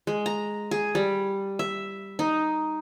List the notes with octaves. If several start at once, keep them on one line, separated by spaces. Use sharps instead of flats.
G#3
A#5
G#4
G3
E5
D#4